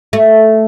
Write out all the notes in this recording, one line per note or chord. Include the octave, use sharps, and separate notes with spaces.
A3